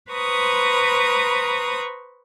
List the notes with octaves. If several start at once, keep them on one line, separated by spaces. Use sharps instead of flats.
B4 C5 A#5 B5 C#6 D#6